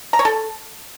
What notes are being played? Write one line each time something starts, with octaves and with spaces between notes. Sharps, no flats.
A#5
C#5
A4